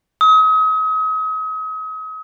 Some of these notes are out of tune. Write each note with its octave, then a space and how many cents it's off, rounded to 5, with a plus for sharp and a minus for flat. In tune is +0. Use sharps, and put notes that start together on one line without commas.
D#6 +40